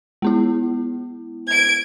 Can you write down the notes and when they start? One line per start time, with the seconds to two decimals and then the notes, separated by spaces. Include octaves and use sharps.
0.22 G#3 B3 E4
1.48 G#6 D7